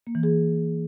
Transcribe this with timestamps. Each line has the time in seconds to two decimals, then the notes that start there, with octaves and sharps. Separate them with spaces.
0.07 A#3
0.15 E3
0.23 G#4